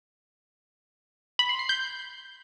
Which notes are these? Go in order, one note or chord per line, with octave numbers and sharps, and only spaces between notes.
B5
C6
C7
G6